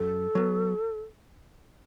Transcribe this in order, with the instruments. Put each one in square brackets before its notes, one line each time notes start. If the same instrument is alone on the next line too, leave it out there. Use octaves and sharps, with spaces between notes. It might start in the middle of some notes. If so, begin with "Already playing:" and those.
Already playing: [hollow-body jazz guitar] F#2 [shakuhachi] A4
[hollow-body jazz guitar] F#3 B3